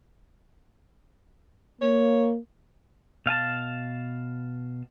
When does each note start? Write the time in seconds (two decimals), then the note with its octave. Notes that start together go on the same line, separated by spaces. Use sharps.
1.81 A#3 C#5
3.26 B2 F5 G#5 A5